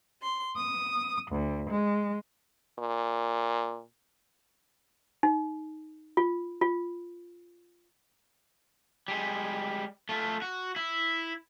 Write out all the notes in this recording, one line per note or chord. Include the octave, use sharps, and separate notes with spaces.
C6
D#6
D2
G#3
A#2
D#4
F4
F4
G3 G#3
A3 F4
F#4
E4